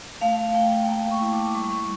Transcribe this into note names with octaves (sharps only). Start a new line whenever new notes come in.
A3 F5
A3 G5
G5
A#3 A5
C#6
E4
D6
G3 C#6
C#6